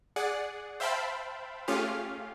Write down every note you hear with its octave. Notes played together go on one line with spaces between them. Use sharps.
G#4 D5 F#5
C5 E5 F5 G5 A5 B5
A3 C#4 F4 G4 G#4 F5